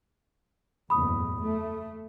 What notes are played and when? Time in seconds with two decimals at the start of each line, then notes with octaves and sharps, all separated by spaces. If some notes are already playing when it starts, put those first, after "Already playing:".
0.90 F#1 E2 A2 B5 D#6
1.42 A3